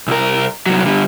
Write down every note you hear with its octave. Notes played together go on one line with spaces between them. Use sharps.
C2 A#4
C2 F#3
D3 G3